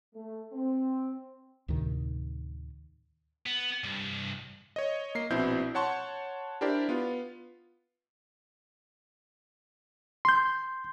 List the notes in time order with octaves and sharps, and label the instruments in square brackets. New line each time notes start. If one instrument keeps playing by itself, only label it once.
[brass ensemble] A3
C4
[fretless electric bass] D2 A2 C3 D#3
[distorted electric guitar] B3
C2 G2
[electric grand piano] C#5 D#5
A#3 C7
A#1 B2 C4 E4 G6
C#5 F#5 A5 C6 C#6
D4 E4 G4 A#4 C5 D5
B3 F4
[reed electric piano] C6 G6